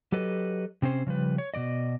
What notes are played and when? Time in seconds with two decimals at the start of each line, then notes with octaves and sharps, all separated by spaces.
0.12 F#3 G4 A4 B4 D#5
0.82 C3 C4 C#4 C5
1.06 C#3 F3 G3 B4
1.38 C#5
1.54 B2 E3 D5 D#5